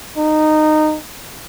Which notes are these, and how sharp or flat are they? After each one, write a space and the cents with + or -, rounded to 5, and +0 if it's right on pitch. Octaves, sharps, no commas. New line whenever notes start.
D#4 -15